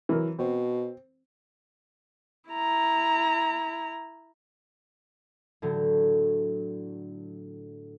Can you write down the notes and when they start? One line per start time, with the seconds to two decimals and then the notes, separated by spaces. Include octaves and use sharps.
0.09 E3 F#3 A#4
0.39 B2 C4
2.50 E4 A#5
5.62 A2 D3 F#3